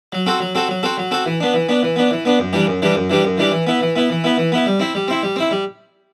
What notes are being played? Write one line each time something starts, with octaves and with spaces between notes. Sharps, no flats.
F#3
C4 F#4 A4
F#3
C4 F#4 A4
F#3
C4 F#4 A4
F#3
C4 F#4 A4
E3
B3 D4
E3
B3 D4
E3
B3 D4
E3
B3 D4
F#2
E3 G3 D4 G4
F#2
E3 G3 D4 G4
F#2
E3 G3 D4 G4
F#2
E3 G3 D4 G4
E3
B3 E4
E3
B3 E4
E3
B3 E4
E3
B3 E4
G3
C4 E4
G3
C4 E4
G3
C4 E4
G3